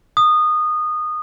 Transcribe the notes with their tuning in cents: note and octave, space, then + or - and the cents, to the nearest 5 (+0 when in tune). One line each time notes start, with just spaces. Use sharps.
D#6 -20